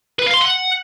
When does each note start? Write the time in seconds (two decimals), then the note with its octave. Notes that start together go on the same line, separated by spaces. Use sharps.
0.19 B4
0.26 F5
0.34 C6
0.41 F#5